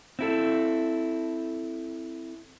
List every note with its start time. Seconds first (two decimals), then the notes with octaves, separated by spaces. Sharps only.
0.19 C4 E4 A4